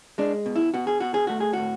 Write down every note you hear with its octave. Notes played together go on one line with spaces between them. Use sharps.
G#3 D4
B2
E4
B2 F#4
G#4
B2 F#4
G#4
A3 F#4
G#4
A2 F#4